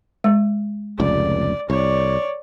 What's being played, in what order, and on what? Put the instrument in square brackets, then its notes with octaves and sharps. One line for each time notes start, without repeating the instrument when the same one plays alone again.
[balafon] G#3
[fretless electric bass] F1 C#2 [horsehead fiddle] D5
[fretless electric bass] C2 [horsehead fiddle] C#5 D5